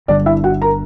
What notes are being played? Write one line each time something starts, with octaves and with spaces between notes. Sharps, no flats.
G1 G2 D3 D4 D5
E4 E5
F#4 F#5
A#4 A#5